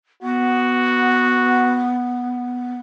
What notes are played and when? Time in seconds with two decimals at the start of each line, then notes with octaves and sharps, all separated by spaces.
0.22 B3 F#4